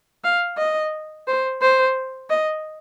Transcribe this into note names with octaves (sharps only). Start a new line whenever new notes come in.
F5
D#5
C5
C5
D#5